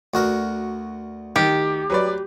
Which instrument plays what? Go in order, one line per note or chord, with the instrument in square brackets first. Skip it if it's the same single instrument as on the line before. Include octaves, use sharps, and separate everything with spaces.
[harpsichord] D2 F#4 A#4
[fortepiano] D#3 [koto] G4
[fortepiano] F#3 B4 D5